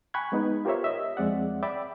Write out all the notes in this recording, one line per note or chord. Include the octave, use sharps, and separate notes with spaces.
G5 G#5 B5 C#6 F#6 G#6
G#3 B3 D#4 B4
F4 G4 A#4 C5 C#5 E5
D#5 E5
F2 G#3 C4 D5 F#5
D5 E5 G5 B5 D6